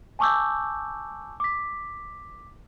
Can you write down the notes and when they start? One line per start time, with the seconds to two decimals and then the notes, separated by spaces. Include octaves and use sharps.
0.19 G#5 A5 C#6 D6 E6 G6
1.40 D6 B6